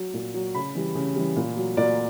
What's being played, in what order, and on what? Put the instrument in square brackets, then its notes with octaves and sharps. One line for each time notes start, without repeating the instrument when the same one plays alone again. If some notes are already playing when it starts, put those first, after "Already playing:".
Already playing: [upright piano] F#3
A#2
F#3
C#3 B5
E3 G3
C#3
E3 G3
A#2
F#3
A#2 D5